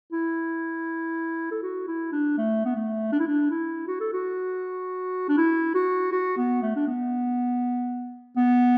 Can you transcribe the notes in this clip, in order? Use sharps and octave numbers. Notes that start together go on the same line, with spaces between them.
E4
A4
F#4
E4
D4
A3
B3
A3
D4
E4
D4
E4
F#4
A4
F#4
D4
E4
F#4
F#4
B3
A3
D4
B3
B3